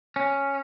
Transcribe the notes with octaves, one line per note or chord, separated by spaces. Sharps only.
C#4